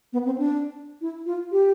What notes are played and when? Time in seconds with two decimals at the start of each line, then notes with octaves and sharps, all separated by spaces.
0.13 B3
0.26 C4
0.38 D4
1.01 E4
1.26 F4
1.52 G4